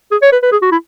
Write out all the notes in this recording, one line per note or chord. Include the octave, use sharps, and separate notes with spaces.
G#4
C#5
B4
B4
G#4
F#4
E4